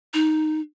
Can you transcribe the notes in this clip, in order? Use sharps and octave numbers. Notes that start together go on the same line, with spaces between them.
D#4